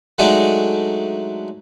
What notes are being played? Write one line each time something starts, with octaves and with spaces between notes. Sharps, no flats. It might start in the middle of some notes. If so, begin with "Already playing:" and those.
F#3 G#3 A3 D4 D#4 F#4